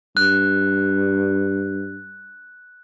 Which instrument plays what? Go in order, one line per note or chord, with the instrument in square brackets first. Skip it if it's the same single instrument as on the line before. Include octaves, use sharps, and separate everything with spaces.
[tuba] G2 [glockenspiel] F#6